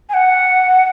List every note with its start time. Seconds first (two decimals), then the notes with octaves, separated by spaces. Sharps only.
0.09 G#5
0.14 F#5